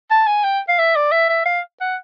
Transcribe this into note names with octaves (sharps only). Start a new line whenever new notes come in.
A5
G#5
G5
F5
E5
D5
E5
E5
F5
F#5